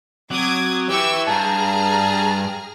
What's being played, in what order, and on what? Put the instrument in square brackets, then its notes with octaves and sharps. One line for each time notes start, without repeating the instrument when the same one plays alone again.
[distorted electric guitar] F#3 [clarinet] C4 [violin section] D6 D#6 G#6
[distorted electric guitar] E3 [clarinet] G4 [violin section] G5 C#6 E6
[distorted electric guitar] G2 [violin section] G#4 A#5 F6 [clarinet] A5